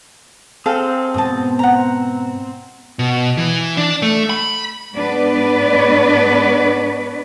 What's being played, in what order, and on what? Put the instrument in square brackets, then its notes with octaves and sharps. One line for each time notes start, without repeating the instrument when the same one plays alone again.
[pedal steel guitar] C4 [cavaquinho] G#4 A4 F5
[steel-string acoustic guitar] G#2 B2 B3 [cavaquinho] A5 D#6
[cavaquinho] F#5 A#5
[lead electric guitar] B2
E3
D4
A3
B5
[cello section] G#2 B3 D4 B4 D5